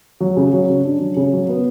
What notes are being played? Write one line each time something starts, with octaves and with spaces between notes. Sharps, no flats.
F#3
C#3
F#3
C#3
D4
F#3
C#3
F#3
B3